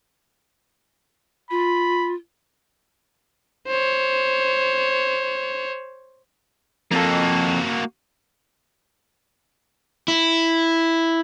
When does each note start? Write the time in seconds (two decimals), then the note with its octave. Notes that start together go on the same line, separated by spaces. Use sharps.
1.51 F4 B5
3.67 C5 C#5
6.91 F2 A#3 F#4 A4
10.08 E4